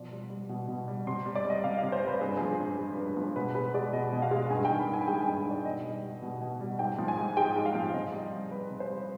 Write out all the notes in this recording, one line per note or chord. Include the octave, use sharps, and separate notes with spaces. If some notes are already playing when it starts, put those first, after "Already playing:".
Already playing: B2 F3 D5
G3
G3
B2
B2
G3
C3 C6
G3
D5
G3 D#5
C3 F5
F5
C3
C5
G3 B4
G2 G#4
B4
G#4
F3
G2
G#3 G#4
B4
G2
B4
F3 G#4
B2 B4
G#3 B4
G#3 D5
B2 D#5
B2
F5
G#3
G2 G#5
G5
D#3
B5
G2 G#5
G#3 G5
G5
G2
D#3
D5
B2 D#5
G3
G3
B2
B2
G3
G#2 G5
F3
G#5
G#2
G#3 G5
G#2
F5
F3
C3 D#5
G3
G3
C3 B4
C3
C5
G3